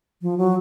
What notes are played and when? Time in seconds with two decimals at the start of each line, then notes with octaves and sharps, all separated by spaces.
0.22 F3
0.38 F#3